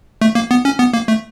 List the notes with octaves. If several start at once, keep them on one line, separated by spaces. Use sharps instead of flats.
A3
A#3
B3
C#4
B3
A#3
A3